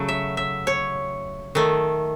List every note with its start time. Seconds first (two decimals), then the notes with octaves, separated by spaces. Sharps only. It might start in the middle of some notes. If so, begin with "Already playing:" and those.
Already playing: C#3 F#3 A3
0.09 E5
0.37 E5
0.67 C#5
1.55 D#3 A3